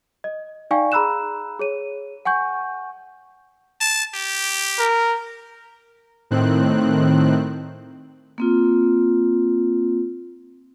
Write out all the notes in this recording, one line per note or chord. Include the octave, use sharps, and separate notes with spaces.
D#5
D#4 D5 F5 G5 G#5 C#6
G#4 A#5 B5 E6 F#6 E7
G#4 C#5 D#7
F#5 G#5 C#6 G6
A5
G4
A#4
A2 D#3 C4 F#6
A#3 C4 F4